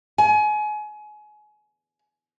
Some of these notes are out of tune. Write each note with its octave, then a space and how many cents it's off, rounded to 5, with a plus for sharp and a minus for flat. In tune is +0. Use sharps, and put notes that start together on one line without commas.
G#5 +30